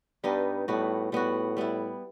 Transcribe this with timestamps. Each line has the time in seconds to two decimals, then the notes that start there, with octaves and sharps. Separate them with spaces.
0.24 G2 G3 B3 D#4
0.68 A2 G3 B3 F#4
1.12 A2 G3 B3 F#4
1.57 G3 B3 E4